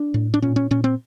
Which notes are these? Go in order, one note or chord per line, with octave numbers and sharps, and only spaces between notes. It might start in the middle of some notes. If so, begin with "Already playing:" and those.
Already playing: D4
A2
D4
A#2 C#4
C#4
A#2 C#4
C4